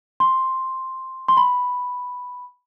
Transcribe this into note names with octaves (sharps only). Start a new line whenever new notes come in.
C6
C6
B5